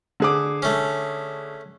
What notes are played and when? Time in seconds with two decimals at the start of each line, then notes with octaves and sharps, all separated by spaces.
0.20 D3 G#4 D6
0.62 A3 C#4